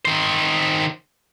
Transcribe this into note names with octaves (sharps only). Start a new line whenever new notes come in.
D#3 C5